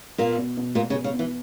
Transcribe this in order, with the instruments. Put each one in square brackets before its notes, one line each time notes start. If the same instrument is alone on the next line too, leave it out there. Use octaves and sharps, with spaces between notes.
[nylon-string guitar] A#2 A#3 [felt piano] B3
[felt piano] B2
B2
[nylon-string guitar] A#2 A#3 [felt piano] B3
[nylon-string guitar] C#3
[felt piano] B3
[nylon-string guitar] C#3
[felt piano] B2
[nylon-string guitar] E3